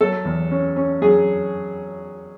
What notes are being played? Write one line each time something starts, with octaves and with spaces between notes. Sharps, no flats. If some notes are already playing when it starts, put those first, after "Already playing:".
F#3 A4
E2
C#4
C#4
F#3 G#4